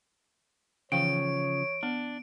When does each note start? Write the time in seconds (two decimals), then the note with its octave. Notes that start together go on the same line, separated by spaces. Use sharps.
0.92 C#3 E3 F3 C#5 F5 G5 D7
1.83 B3 D4